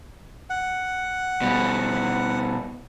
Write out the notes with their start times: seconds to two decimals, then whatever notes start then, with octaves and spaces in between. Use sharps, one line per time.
0.50 F#5
1.41 B2 G3